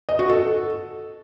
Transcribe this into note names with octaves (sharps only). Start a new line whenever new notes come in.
D#5
F#4
A4